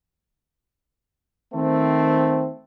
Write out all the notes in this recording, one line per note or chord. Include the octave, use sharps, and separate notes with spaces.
D#3 A3 C4